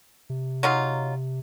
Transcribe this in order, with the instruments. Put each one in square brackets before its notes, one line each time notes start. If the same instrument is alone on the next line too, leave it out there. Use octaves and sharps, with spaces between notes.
[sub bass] C3
[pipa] F#3 D#4 F4